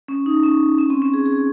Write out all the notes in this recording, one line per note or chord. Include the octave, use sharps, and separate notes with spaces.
C#4
D#4
C#4
C#4
C4
C#4
G#4
G#4